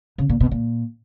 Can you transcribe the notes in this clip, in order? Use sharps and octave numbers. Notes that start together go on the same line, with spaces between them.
C#3
A#2
B2
A#2